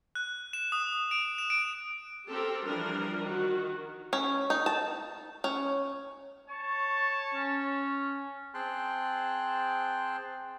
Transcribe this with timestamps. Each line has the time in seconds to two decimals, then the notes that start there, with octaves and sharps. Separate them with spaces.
0.15 F#6
0.53 E7
0.72 D#6
1.11 D7
1.38 E7
1.50 D7
2.27 C4 G4 A4 A#4
2.64 E3 F3 G3 D4 A#4
3.23 D#3 F#4
4.13 C#4
4.50 D#4
4.66 A5
5.44 C#4
6.50 C#5 A5 C#6
7.34 C#4
8.54 C4 G#4 G5 A5 C6 F#6